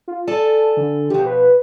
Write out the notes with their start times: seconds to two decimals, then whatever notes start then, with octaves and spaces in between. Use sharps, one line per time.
0.08 F4
0.28 A4 D5 G#5 A5
0.77 D3
1.10 B2 F3 G4
1.26 B4